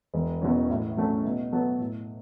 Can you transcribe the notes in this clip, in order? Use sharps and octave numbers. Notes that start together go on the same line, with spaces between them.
E1
E2 B2 F#3 C#4
A2
F#3 A3 C#4 A4
B2
F#3 B3 A4
A2